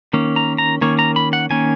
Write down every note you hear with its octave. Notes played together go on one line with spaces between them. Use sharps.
D#3 A#3 C#4
A#5
A#5
D#3 A#3 C#4 C#5
A#5
B5
F#5
D#3 A#3 C#4 G#5